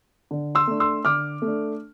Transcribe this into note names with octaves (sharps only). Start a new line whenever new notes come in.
D3
C6 E6
A3 D4
C6 E6
D3 D6 F6
A3
D4